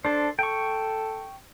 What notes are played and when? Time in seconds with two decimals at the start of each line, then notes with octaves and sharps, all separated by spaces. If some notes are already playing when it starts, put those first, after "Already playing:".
0.05 D4 A4 C5
0.39 A4 G5 C#6